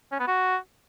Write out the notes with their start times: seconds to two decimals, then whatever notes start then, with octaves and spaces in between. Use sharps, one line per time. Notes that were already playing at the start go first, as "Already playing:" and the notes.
0.12 C#4
0.20 B3
0.28 F#4